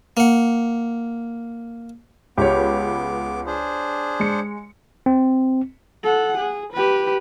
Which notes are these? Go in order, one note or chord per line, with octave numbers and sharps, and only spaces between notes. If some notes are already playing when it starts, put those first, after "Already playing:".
A#3 F#5
C#2 B3 G4 C#5 D6
D4 G#4 C5
G#3 C#7
C4
A4 F#5
G#4
G4 B4